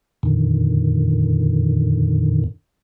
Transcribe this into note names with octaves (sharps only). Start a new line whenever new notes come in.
F2 A#2 D3 D#3